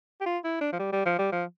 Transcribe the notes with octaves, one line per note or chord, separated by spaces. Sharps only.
G4
F4
E4
D4
F3
G3
G3
F3
G3
F3